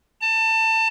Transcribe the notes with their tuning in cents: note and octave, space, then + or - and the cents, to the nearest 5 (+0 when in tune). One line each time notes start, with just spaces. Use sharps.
A5 +25